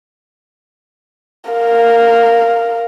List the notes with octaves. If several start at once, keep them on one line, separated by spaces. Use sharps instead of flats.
A#4 F5